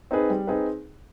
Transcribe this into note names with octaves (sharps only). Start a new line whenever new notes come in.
C4 D#4 G#4 B4
G3
C4 D#4 G#4 B4